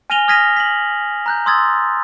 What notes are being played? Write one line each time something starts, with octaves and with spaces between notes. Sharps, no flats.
G#5 F6 A#6 D#7 F7 G7
D#6 F6 G#6 A#6 B6 D#7
B6 F#7
A#5 F#6 G6
C6 D#6 E6 G#6 A6